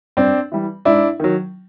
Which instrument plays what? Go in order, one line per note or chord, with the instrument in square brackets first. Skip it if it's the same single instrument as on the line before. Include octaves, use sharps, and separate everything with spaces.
[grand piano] G2 C4 D4
E3 G3
G#2 D4 E4
D#3 F#3